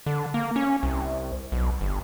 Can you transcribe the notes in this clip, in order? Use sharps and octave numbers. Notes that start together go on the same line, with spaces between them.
D3
A#3
C#4
C2
B1
G1